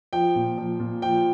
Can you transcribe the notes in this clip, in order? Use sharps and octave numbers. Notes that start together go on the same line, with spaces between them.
F3 G5
A#2
F3
A#2
F3 G5